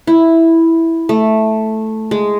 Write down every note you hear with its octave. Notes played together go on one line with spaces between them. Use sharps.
E4
A3
G#3